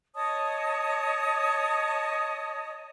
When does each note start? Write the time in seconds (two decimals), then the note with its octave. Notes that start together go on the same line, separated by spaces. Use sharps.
0.15 C#5 D#5 A5 D#6